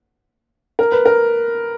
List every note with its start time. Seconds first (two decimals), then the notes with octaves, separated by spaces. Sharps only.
0.79 A#4
0.92 B4
1.06 A#4